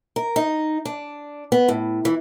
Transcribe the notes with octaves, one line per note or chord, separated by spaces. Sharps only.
A#4
D#4
D4
B3
A2
E3